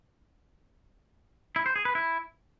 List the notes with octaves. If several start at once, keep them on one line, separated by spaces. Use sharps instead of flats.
E4
C5
G#4
B4
E4